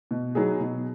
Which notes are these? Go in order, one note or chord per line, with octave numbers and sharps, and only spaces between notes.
B2
F#3 B3 D#4 G#4
B2